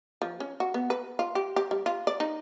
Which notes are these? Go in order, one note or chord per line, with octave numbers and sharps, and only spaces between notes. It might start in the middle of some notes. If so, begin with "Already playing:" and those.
F3
C#4
F#4
B3
B4
F4
G4
G4
G3
F4
D5
D#4